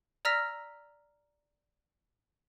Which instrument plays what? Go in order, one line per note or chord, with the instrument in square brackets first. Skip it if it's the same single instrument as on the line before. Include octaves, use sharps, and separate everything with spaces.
[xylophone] D5 A#5 E6 F6 A#6 B6